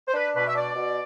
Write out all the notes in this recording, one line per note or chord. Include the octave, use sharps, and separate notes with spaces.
C5
D4 B4
B2 B4
E5
D4 D5
B2